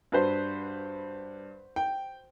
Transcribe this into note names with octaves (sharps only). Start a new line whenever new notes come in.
G2 F#4 B4 C5
G5